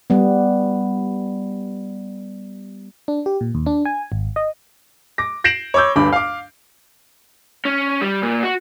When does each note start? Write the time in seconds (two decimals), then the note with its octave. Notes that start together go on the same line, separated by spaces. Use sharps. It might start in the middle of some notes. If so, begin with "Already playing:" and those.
0.10 G3 B3
3.08 D4
3.26 G4
3.41 A#2
3.55 D#2
3.66 D4
3.85 G#5
4.12 G#1
4.36 D#5
5.18 D6 A#6
5.44 G6 A#6 C7 D7 E7 F#7
5.74 C#5 B5 D6 E6 G6
5.96 G1 D2 G2 B5 D6
6.13 F5 D6
7.65 C#4
8.02 G3
8.23 A#2
8.43 F#4